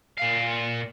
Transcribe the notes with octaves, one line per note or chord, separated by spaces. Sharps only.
A#2 F5